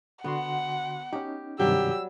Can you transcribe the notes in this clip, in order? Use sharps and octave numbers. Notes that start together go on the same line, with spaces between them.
D3 B3 F#4 F#5 C6
C#4 D#4 G4
G2 C3 D#3 F#3 G3 G4 E6